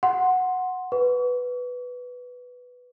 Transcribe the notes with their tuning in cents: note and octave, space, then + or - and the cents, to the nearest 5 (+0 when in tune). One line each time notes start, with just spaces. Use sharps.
F#5 -5 C6 +5
B4 +0 C#6 +45